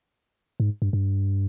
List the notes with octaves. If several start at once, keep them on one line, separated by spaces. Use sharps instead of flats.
G#2
G2
G2